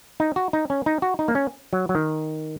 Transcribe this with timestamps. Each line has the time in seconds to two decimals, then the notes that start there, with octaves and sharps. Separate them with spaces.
0.20 D#4
0.36 F#4
0.53 D#4
0.70 C#4
0.86 D#4
1.02 F#4
1.19 D#4
1.28 A#3
1.35 C#4
1.73 F#3
1.89 F#3
1.95 D#3